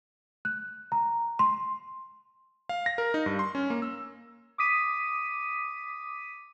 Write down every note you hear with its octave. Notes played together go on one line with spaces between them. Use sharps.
F#6
A#5
C6
F5
A#6
A#4
D#4
G2
C6
C#4
A#3
E6
D6 D#6 B6 D#7